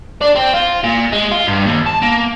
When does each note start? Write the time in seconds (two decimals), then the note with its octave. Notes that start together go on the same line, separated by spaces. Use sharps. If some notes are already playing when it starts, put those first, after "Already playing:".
0.21 D4
0.36 C4
0.54 F4
0.84 A#2
1.13 G#3
1.32 F4
1.47 G2
1.67 D#2
1.87 A5
2.03 A#3